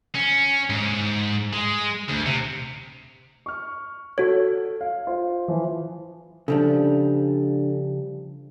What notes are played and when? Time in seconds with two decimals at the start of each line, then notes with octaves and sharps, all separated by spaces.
0.15 C#4
0.70 G#2
1.53 G#3
2.09 D2
2.26 C3
3.46 C#6 F6
4.18 F#4 A4 C#5
4.81 F5
5.07 F4 C5
5.48 E3 F3 E4
6.48 C#3 F3 G3 D4 A4